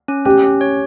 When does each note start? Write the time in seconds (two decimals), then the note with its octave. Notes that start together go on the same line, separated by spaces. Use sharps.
0.08 C#4
0.25 C#4 G4
0.43 C#4
0.61 C#5